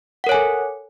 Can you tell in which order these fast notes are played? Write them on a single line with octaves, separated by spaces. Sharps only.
F#5 A#4 C#5 G#5 A4